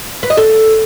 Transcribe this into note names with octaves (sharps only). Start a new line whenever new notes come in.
B4
D#5
A4